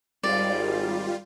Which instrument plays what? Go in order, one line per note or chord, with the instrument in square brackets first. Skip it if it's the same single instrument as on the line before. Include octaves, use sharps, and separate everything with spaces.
[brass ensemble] G#1 [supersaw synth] G3 F4 [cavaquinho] D5